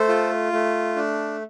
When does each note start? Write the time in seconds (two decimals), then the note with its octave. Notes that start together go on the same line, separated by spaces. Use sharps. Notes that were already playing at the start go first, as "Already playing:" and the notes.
Already playing: A3 A4 C5
0.09 F4
0.52 A3
0.96 D4